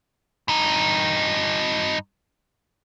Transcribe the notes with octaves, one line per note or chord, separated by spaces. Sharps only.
G2 D#4